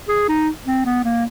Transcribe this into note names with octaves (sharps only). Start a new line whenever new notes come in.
G#4
D#4
C4
B3
A#3